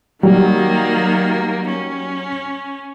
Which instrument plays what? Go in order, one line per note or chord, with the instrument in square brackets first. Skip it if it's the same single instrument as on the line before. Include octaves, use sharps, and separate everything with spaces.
[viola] D#3 A#3 [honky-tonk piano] F#3 G3
[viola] C#4